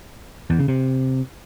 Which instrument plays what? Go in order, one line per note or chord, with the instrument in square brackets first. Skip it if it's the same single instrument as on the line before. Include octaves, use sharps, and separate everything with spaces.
[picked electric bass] E2
C#3
C3